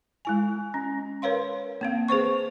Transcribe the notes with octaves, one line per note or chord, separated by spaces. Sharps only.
G#3 E4 G#5
C#4
A#4 B4 C#5 F5 C6
A#3 C4 F5
G#4 B4 C5 C#6